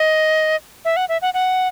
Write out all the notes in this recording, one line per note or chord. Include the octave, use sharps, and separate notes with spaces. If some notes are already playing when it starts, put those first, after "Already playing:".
Already playing: D#5
E5
F#5
E5
F#5
F#5